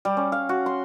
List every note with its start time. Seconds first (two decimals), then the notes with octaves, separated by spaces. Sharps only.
0.05 G3
0.17 C#4
0.32 F5
0.49 F#4
0.66 C6